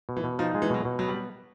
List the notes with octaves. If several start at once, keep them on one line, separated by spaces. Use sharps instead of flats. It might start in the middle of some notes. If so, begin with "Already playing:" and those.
B2
E3
B2
F3 D#4
F3
G#3
E3
B2 F#3
B2
F#3 B3
G3